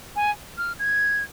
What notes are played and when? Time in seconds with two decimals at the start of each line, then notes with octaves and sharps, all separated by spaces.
0.16 G#5
0.58 F6
0.79 G#6